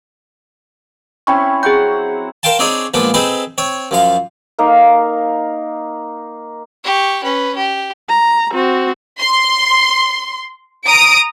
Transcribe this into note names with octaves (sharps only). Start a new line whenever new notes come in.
C4 C#4 E4 G5 B5 C#6
F#3 C4 G#4 F#5 G6
A#4 C5 F5 G5 A5
C4 D4 D#4 G#4 C#5
A#2 F3 G#3 B3 D4
C4 D#4 G#4 A4 B4 C5
C4 C#5
F#2 F3 F5
A#3 D#4 A#4 F5
G4 C#6
C#4 B4
G4
A#5
C4 F#4
C6
A#5 D#6 D7